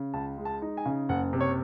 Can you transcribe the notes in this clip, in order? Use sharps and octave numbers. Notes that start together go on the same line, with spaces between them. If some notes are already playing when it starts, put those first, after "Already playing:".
Already playing: C#3
C#2 A5
G#3
A5
D#4
G#5
C#3
F#1 F#5
C3
C#5